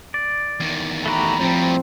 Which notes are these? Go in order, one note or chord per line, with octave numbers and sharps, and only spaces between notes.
D5
E2 D#3
A3 F#4 G4 A#5 B5
A2 F3 G3 C4 G5